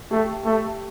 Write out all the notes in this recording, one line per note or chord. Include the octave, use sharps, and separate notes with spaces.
A3 G4
A3 G4